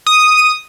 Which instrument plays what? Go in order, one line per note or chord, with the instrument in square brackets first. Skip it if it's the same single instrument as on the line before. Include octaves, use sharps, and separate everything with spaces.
[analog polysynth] D#6